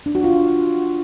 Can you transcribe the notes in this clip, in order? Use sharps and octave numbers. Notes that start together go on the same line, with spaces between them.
D4
F#4
F4